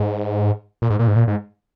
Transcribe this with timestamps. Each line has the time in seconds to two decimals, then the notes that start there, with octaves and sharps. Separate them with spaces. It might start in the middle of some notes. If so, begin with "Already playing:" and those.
Already playing: G#2
0.82 A#2
0.90 G#2
0.99 A#2
1.07 G#2
1.16 A#2
1.28 G#2